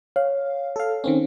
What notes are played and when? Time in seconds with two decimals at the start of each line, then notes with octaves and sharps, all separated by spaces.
0.16 C#5 F5
0.76 A4 F5
1.04 D#3 C4 C#4